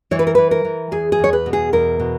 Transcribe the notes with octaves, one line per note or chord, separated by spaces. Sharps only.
E3 C#5
B4
A#4
E3 B4
A#4
E3
E2 G#4
G#4
E2 C#5
B4
B2
G#4
E2 A#4
B2